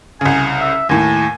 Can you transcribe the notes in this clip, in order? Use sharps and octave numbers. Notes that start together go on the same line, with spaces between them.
C2 C#3 G#5
E5
D#2 A2 G#5